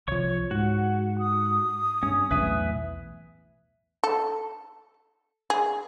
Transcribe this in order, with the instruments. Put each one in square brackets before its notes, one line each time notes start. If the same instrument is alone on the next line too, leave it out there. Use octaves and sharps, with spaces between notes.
[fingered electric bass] C2 F3 [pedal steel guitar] C#5 C#6
[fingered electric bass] G#2 [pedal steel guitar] F#4 [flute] F#5
[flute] D#6
[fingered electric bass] G2 [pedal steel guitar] C#4
[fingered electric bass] B1 E2 A2 [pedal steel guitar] B4 E5 G#5
[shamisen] A4
G#4